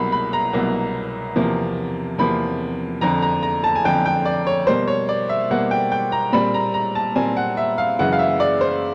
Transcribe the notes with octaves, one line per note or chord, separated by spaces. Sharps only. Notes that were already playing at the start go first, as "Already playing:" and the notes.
Already playing: C2 B2 F#3 A#3 B5
B5
A#5
C2 B2 F#3 A#3
E2 C3 F3 A#3
E2 C3 F3 A#3 B5
F2 D3 F3 A#5
A#5
A#5
A5
G#5
F2 D3 F3 G5
G5
D5
C#5
B2 G3 A#3 C5
C#5
D5
E5
B2 G3 A#3 F#5
G5
G5
A#5
A#2 G3 C4 B5
A#5
A#5
A5
A#2 G3 C4 G#5
F#5
E5
F5
F#2 C#3 E3 G#3 F#5
F5
E5
D5
C5